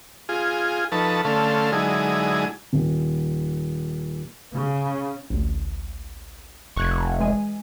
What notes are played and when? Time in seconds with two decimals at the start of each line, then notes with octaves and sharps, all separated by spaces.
0.29 F4 G#4
0.92 F3 D#4 A4 B4 A5 C#6
1.25 D3 A3 C#4 A4 F5 C6
1.72 D3 F#3 G#3 D#4 E4 G#4
2.73 D#1
4.54 C#3
5.30 A1 D2
6.76 F1 C#6 F#6 G#6
7.19 E3 G#3 G#5